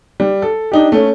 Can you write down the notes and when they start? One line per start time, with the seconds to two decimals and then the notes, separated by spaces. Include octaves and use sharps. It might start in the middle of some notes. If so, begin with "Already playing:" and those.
0.20 G3
0.42 A4
0.72 D4 D#4 G4
0.92 A3 C#4